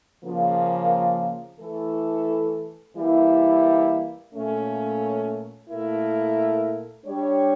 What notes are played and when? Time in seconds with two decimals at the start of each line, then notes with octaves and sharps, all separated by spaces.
0.24 C#3 F3 A#3
1.60 E3 A3 E4 A4
2.97 E3 G3 A#3 E4
4.34 A#2 A3 C#4
5.69 A#2 A3 E4 A#4
7.06 G3 D4 G4 C#5